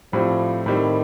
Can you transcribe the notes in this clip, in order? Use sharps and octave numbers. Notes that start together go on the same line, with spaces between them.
A2 F3 G3 C4
A2 D#3 G3 C4